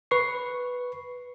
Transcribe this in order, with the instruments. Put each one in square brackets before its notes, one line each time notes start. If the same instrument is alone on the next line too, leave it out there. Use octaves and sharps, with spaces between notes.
[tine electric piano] B4 C#6 C7